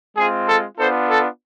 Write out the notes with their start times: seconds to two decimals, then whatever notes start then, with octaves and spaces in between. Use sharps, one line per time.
0.16 G#3 C4 F4 G#4
0.47 A4
0.78 B3 D4 F4 A4 C5
1.09 A4